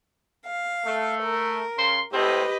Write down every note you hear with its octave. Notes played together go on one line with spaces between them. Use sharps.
F5
A3
A#4
C#3 C6
A2 C4 G4 B4 D#5